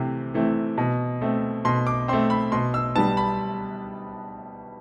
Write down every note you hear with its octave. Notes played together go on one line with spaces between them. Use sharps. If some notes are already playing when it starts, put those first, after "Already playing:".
Already playing: C3 E3 A3 C4
E3 A3 C4
B2
A3 C4
B2 C6
D6
A3 C4 C6
B5
B2 C6
E6
G3 B3 A5
B5